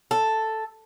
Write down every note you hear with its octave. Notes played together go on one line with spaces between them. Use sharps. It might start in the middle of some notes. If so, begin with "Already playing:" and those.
A4